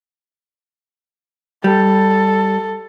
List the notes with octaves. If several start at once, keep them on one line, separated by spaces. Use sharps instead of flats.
G3 A4